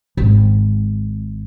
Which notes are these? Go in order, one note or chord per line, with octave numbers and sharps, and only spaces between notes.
G#1